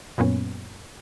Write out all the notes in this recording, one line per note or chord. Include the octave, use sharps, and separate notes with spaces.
F#2 A#2 B3 C#4